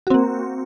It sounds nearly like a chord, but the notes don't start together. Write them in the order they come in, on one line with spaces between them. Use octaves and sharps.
F#4 C4 A#3